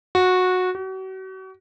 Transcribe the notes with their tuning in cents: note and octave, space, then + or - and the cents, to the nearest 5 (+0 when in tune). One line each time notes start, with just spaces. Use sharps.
F#4 -15
F#4 +40